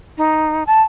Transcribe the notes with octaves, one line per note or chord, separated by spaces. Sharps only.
D#4
A5